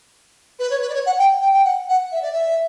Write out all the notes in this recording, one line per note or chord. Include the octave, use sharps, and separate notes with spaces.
B4
C#5
B4
D5
C#5
F#5
G5
G5
G5
F#5
F#5
E5
D5
E5